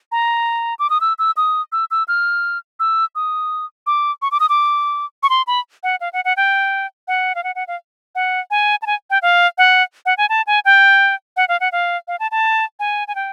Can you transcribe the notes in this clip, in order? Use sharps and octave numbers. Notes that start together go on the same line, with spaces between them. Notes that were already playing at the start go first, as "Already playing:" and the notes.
A#5
D6
D#6
E6
E6
D#6
E6
E6
F6
E6
D#6
D6
C#6
D6
D#6
D6
C#6
C6
B5
F#5
F5
F#5
F#5
G5
F#5
F5
F#5
F#5
F5
F#5
G#5
A5
G#5
G5
F5
F#5
F#5
G#5
A5
G#5
G5
F#5
F5
F#5
F5
F5
A5
A5
G#5
G#5
G5